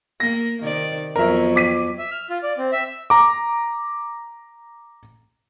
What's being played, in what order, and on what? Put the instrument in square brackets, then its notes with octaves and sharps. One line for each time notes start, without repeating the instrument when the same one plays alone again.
[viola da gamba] A#3 [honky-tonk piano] A#6
[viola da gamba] C3 D#3 D5
[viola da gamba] F2 F#3 B3 [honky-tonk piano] A#4 E5
[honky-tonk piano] D6 B6 D#7
[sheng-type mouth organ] E5
F6
F4
D5
C4
E5
[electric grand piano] A#5 D6